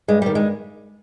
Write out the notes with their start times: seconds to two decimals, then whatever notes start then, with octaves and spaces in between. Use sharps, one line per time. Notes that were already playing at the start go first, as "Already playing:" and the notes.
0.08 G2 G#3
0.22 D#3 G3
0.35 G#3